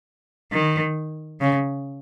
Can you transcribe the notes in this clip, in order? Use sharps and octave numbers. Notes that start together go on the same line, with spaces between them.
D#3
C#3